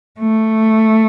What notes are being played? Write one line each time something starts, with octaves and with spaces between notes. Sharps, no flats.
A3